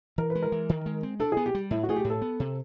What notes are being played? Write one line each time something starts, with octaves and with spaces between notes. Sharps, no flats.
E3 A#4
B4
G#3
A#4
E3
D#3
G#3
C4
D4 A4
G#4
B3
G4
G3
A2 E4
F#4
A3 G#4
G4
A2
A4
B3
C3